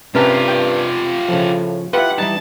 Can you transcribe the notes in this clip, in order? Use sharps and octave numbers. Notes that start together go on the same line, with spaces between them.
G2 C3 C#4 F4 G4 A#4 B4 A5
G5
A2 C#3 F3
E4 F4 G4 B4 F#5
E3 G3 D#4 A5